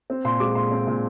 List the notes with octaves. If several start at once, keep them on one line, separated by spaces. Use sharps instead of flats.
C4
A#2 C6
G#3 D6
A#2 C6
C4
A#2